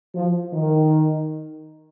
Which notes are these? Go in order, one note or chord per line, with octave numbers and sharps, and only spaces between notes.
F3
D#3